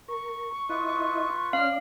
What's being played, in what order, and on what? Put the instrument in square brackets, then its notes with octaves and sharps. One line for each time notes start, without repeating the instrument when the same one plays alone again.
[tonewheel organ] A#4 [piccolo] C#6
[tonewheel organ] E4 D#5 [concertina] F4 B4
[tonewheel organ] C#4 D5 [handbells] F5 [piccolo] F6